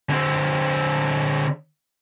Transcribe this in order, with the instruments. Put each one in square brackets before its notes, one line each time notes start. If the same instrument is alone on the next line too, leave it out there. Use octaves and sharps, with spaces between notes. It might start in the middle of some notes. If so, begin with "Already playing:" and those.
[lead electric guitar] D3 C4